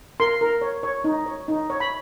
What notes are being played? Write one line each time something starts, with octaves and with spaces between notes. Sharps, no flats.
A#4 C6
A#4
C#5
C#5
D#4
C#5
D#4
C#5
B5